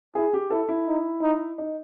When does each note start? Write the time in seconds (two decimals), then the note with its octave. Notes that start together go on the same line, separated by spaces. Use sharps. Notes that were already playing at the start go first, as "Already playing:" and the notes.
0.15 E4 G#4
0.33 G4
0.50 E4 A4
0.69 E4
0.87 D#4
1.22 D#4
1.58 D#4